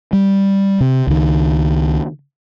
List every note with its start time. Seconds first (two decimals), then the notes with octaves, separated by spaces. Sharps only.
0.13 G3
0.81 C3
1.07 C#2 D#3